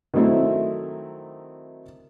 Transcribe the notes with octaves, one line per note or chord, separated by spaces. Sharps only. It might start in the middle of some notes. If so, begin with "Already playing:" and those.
D#3 F#3 A3 C4 E4